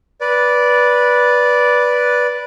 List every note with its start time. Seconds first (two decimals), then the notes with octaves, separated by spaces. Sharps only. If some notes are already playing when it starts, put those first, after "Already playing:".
0.21 B4 D5